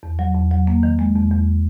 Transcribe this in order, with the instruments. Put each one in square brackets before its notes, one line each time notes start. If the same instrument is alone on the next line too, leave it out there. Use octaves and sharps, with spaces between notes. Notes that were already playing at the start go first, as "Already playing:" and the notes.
[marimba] E2
F#3
E2
F#3
A#3
D#3
G#3
E2
E2